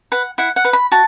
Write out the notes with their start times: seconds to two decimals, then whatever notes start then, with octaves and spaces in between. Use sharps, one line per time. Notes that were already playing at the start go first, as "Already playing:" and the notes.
0.12 B4 F#5
0.38 E4 F#5
0.56 F#5
0.65 B4
0.73 B5
0.92 F#4 A5